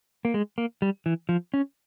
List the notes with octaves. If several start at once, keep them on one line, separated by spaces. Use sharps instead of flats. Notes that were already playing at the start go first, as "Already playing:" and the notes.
A#3
G#3
A#3
G3
E3
F3
C#4